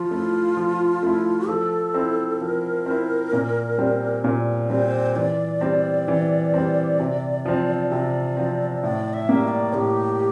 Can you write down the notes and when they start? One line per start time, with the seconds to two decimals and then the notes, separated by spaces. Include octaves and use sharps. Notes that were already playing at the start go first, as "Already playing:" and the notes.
Already playing: F3 F4
0.11 A3 E4
0.57 F3
1.03 A3 E4
1.49 F3 A4
1.94 C4 E4
2.41 F3 A#4
2.86 C4 E4
3.33 A#2
3.78 G3 C4
4.24 A#2
4.70 G3 C4 C5
5.16 E3 D5
5.61 G3 C4
6.08 E3
6.54 G3 C4
6.99 C3
7.45 F3 C4
7.90 C3 D5
8.37 F3 C4
8.83 A2 D5
9.13 E5
9.29 G3 A#3
9.44 E5
9.48 D5
9.74 A2 G4